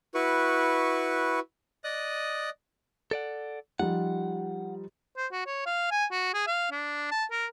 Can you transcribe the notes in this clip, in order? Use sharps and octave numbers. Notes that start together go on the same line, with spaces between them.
E4 F#4 B4 C#6
D5 D#5 D#6 F#6
A4 D5 F#5
F3 G3 D#4 F#5
C5
F#4
C#5
F5
G#5
F#4
G#4
F5
D4
A5
A#4